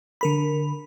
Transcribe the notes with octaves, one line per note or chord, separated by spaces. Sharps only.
D3 A#4 B5